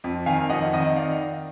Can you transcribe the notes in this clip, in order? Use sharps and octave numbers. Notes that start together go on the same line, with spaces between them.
F2
D#3 F5 G#5
F2 D#5 F#5
D#3 D#5 F#5
D5 F5